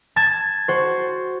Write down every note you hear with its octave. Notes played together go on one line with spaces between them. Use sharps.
A5 G#6 A6 E7
F#4 C5